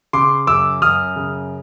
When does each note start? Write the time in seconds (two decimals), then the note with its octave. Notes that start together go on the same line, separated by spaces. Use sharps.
0.13 C#3 C6 D6
0.47 F#2 D6 E6
0.82 F#2 D#6 F6
1.16 C#3